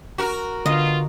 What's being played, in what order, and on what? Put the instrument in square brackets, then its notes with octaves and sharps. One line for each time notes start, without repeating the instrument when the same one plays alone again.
[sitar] F#4 A#4
[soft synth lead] D3 [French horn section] B3 F4 [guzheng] D#5